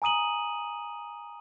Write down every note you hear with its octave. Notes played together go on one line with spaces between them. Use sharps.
G#5 A#5 D#6 D#7 F#7